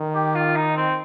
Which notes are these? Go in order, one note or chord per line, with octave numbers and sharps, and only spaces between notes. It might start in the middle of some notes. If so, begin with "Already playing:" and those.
Already playing: D#3
G4
F4
D#4
C4